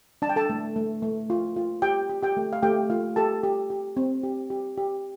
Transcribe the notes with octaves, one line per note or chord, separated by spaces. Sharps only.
D4 A5
G5
A4 A5
A3
A3
A3
F4
F4
G4 G5
G4
G4 G5
A3
F5
A3 G4 G5
A3 F4 F5
G4 A4 A5
G4
G4
C4
G4
G4
G4